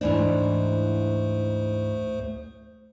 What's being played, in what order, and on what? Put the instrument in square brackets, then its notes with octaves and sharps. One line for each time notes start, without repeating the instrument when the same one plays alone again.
[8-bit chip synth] D2 A3 C5 [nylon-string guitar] G#2 E3 D4